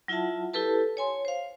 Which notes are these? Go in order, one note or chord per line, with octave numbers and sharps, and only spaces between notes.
F#3 E4 F4 E5 F#5 A5
E4 G4 A4 B4 A5
C#5 G#5 C6
C5 F5